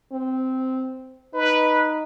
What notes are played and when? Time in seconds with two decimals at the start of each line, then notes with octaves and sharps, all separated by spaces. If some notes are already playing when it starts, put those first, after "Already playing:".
0.12 C4
1.34 D#4 B4